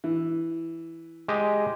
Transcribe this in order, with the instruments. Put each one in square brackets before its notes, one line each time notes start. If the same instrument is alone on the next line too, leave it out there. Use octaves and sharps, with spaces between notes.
[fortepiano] E3
[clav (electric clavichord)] G#3 G4 D#5